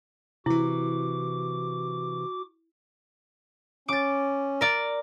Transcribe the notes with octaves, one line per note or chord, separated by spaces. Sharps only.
C3 E3 E4 F#4 D6
C#4 D6 A6
A#4 D5